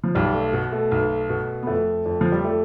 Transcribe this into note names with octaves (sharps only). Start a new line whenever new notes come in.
F3
B1 G3
A3
B2
A3
B1
B2
B3
F2 A3
F2
F3
G3
F3 A3